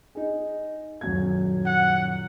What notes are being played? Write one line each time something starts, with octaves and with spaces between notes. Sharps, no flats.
D#4 G#4
D#1 F#2 G#6
F#5